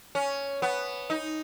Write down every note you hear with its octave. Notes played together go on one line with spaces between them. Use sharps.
C#4
B3
D#4